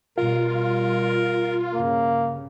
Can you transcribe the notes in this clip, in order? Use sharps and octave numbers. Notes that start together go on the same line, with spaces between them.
B2 G3 F4 A#4
G2 C#3 A#3